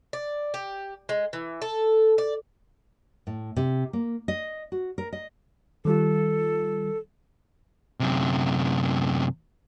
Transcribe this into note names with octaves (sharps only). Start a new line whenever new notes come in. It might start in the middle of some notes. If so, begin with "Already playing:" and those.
D5
G4
G#3
E3
A4
D5
A2
C3
A#3
D#5
F#4
A#4
D#5
D#3 G3 F4 A4
F#2 C3